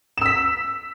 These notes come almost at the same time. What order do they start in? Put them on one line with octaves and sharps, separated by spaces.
E7 E6 B6